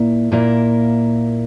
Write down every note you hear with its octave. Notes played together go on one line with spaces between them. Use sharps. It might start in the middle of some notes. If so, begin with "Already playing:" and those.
Already playing: A#2 A#3 E4
A#2 A#3 E4 A#4